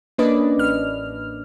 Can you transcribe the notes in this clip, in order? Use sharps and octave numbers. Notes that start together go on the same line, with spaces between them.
A#3 C#4 D4 B4 D5 D#5
A1 F6